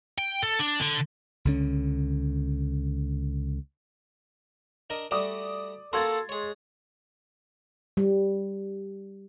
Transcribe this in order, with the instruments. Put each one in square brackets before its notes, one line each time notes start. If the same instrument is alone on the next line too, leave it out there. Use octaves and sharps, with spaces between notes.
[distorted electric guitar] G5
A4
D4
D3
[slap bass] C#2 D3 C#4
[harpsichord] D4 A#4 D#5
[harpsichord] G3 A3 F#4 [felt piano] D5 D6 D#6
[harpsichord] A#3 F#4 [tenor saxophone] A4 [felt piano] C6 G#6 A6
[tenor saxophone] G#3 [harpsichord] G#4 C#5
[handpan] G3